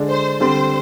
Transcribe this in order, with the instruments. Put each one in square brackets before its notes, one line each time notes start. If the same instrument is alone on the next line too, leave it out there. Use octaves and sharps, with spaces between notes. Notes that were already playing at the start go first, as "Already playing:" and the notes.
Already playing: [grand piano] D3 G#3 D4
[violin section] C5
[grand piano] D3 G3 C4 [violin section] C5